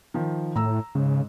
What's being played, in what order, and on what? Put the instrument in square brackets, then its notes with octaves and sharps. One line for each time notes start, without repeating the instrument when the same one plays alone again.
[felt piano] D#3 F3
[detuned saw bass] A2 [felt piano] A#5 E6
[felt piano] G#2 [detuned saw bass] C#3